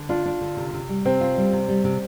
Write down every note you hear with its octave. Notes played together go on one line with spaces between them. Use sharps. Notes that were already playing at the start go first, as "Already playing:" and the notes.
Already playing: D3
D4 F4
D4
D3
C3
C3
G3
C3 C4
F4
G3
C3
G3
C3